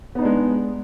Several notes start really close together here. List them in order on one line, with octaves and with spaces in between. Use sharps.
B3 D#4 D4 G#3